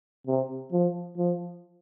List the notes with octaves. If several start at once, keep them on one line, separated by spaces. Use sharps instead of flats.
C3
F3
F3